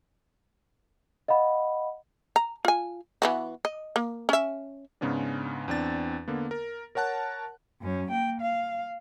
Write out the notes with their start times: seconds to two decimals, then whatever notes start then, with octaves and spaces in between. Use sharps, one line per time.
1.28 D#5 F5 F#5 B5
2.36 A#5
2.65 F4 G#5
3.22 E3 B3 F#4
3.65 D#5
3.96 A#3
4.29 C#4 E5
5.01 G#2 C#3 B3 C#4 D4
5.68 E2 C4 D4 A6
6.28 D3 A#3 B3
6.51 A#4
6.95 A#4 C#5 F#5 A5 F#6
7.81 F#2 C#4
8.10 A#3 G5
8.41 F5